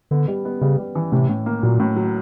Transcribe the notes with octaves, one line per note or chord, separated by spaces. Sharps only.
D3 B3
G3
B3
C#3 G3
G3
E3
A2 C3
A2
A#3
A#2 F#3
A2
F#3